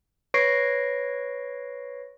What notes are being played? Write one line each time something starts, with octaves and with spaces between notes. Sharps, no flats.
B4 C#5 C#6 A#6 C7 D7